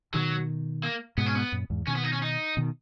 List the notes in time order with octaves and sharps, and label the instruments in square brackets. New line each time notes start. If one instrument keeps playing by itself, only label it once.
[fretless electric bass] B2 D#3 [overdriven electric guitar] F#3
[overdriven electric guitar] A#3
[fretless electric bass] G#2 B2 [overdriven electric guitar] B3
[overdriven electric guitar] C#4
B3
[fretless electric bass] F#2 A#2
E2 G#2
[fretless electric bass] B2 D#3 [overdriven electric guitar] C#4
[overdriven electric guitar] B3
D#4
C#4
D#4
[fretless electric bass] B2 D#3